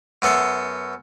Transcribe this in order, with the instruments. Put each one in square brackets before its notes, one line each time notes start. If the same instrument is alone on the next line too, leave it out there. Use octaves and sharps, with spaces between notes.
[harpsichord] F#2 B3 A4 E5 C6